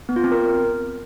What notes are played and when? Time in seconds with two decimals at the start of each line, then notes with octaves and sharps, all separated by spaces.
0.09 B3
0.16 F4
0.24 C4
0.31 A#4